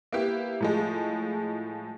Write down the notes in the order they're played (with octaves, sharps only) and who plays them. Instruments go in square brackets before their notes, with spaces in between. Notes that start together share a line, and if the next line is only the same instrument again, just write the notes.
[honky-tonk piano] A#3 B3 E4 G4
A2 F3 G#3